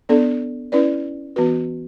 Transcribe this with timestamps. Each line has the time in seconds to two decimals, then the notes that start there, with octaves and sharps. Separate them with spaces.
0.09 B3 D4 A4 D5
0.72 C#4 E4 B4 D5
1.36 E3 B3 F#4 B4